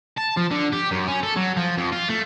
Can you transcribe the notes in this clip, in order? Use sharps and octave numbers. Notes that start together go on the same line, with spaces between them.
A5
F3
D3
G4
F#2
C#4
A4
F#3
F3
F2
F4
A3